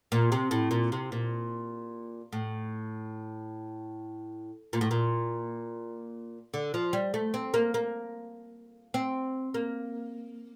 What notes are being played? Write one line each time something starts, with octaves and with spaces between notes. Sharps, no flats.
A#2
C3
A2
A#2
C3
A#2
A2
A#2
A2
A#2
D3
F3
G3
A3
C4
A#3
A#3
C4
A#3